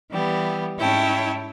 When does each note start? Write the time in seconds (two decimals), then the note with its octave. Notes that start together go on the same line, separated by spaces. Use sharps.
0.11 E3 G3 B3
0.77 G#2 C#4 E4 C#5 G5 A5